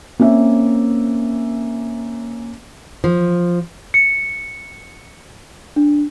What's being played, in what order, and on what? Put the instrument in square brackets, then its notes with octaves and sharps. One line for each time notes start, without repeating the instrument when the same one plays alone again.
[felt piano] A#3 C4 C#4 E5
[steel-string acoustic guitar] F3
[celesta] C#7
D4